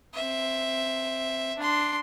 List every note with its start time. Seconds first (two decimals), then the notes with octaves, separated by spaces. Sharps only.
0.14 C4 E5
1.58 D4 C6